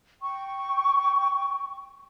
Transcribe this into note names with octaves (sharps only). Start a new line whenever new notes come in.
G5 C#6